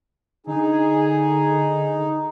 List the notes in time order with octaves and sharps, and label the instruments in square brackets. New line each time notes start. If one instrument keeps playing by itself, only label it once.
[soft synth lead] D3 [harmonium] D#4 [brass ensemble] G#4